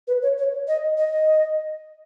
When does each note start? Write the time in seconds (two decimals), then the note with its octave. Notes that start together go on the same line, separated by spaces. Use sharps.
0.08 B4
0.22 C#5
0.38 C#5
0.68 D#5
0.98 D#5